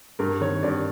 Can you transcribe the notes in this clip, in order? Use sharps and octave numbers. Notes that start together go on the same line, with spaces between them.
G2 A#4
D#3 C#5
G2 D5